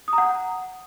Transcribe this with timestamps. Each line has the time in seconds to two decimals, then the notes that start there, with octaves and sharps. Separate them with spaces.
0.08 D#6
0.13 A#5
0.18 F#5